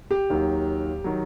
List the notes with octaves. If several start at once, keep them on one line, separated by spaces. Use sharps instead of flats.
G4
D#2 D#3 F#3
D#3 F#3